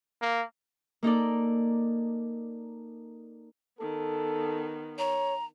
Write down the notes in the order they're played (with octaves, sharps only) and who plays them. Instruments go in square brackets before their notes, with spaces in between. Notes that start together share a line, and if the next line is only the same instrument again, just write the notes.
[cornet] A#3
[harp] A#3 D#4 A4 D5
[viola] D#3 B3 [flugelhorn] A4
[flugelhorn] C#5 [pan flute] A#5